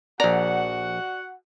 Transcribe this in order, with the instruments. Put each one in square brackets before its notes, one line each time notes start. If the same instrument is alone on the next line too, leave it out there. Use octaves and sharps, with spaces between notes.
[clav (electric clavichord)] A#1 A#5 [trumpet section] F#4 F#5 [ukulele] D5